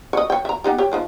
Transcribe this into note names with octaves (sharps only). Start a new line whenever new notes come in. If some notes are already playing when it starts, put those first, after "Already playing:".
C#5 D#5
C#5 G5
E5 A#5
B3 D#4 G4
G4 C#5
D#3 F3 G#3